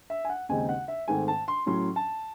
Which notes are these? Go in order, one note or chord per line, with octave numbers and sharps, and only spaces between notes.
E5
G#5
F#5
D#2 C#3 G#3 C4 D#4 G#5
F#5
E5
G#2 D#3 A3 C4 G#5
A5
C6
A2 F#3 C#4 C6
A5